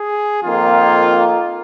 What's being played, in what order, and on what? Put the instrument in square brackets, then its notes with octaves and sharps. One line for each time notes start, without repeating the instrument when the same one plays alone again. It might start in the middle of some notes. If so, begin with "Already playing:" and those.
Already playing: [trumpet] G#4
[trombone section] F2 D#3 A#3 [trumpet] F4